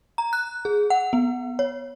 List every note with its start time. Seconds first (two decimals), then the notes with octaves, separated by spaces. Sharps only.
0.18 A#5
0.33 F#6
0.65 G#4
0.90 F#5
1.13 B3
1.59 C#5